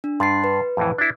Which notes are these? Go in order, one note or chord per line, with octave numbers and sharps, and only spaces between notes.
D4
G2 C6 A6 C7
B4
F2 A2 E3
D4 E4